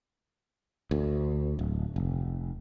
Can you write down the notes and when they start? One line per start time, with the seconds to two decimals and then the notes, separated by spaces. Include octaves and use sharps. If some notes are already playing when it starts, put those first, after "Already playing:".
0.91 D2
1.59 D1
1.96 F1